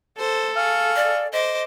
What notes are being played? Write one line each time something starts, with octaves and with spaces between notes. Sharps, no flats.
A4 C5
G#4 F5 C#6
D5
C5 D#5 D6